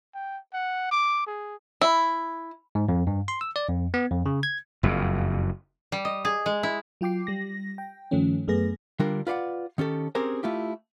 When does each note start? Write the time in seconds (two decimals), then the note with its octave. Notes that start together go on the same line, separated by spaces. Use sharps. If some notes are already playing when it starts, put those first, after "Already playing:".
0.15 G5
0.53 F#5
0.91 D6
1.27 G#4
1.81 E4
2.75 G#2
2.89 F2
3.07 G2
3.28 C6
3.41 E6
3.56 D5
3.69 F2
3.94 B3
4.11 F2
4.26 C#3
4.43 G#6
4.83 F#1 F2
5.92 G3
6.05 D#5
6.25 G#4
6.46 G#3
6.63 E4
7.01 F#3 F4 G5 D6 C7
7.27 G3 A#6
7.78 G5
8.11 G2 D#3 F3 A3 C#4
8.48 F#2 A3 B3 G#4 B4 A#6
9.00 D3 G3 D4 F4 A#4
9.27 F4 B4 D5 F5 F#5
9.78 D#3 C#4 G4 A4
10.15 C4 C#4 G4 G#4 A#4 C5
10.43 A3 E4 F4 G4